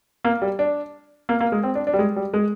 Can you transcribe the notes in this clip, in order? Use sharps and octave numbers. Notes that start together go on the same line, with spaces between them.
A#3
G3
D4
A#3
A#3
G#3
C4
D4
D4
G3
G#3
G3
G#3